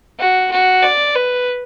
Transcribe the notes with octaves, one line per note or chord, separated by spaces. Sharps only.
F#4
F#4
D5
B4